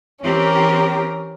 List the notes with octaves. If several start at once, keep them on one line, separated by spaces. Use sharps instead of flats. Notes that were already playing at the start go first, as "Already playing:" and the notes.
E3 C4 C#4 G4 A#4